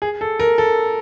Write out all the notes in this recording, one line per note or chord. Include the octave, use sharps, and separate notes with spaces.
G#4
A4
A#4
A4